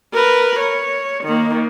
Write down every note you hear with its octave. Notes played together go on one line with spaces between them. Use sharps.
A#4 B4
C#5
D#3 A#3